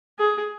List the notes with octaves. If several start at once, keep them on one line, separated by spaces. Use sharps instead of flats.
G#4